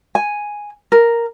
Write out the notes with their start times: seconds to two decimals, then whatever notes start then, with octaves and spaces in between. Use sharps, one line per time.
0.15 G#5
0.92 A#4